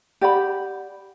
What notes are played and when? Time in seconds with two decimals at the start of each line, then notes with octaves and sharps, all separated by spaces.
0.21 G4 D5 F#5 B5